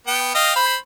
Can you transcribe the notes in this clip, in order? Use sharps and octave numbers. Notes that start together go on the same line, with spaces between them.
B3 G5
D#5 F5 G5
C5 B5